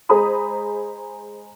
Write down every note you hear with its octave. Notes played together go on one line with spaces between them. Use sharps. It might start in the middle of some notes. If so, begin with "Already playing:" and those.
G#3 G#4 C5 A#5 B5 D#6